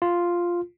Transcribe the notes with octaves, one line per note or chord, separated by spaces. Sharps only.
F4